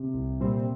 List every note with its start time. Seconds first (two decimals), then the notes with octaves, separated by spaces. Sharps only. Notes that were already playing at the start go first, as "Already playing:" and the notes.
Already playing: C3
0.14 C2
0.40 A#2 G3 C4